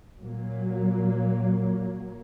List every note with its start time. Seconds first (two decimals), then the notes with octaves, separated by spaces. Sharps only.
0.20 A#2 F#3 A#3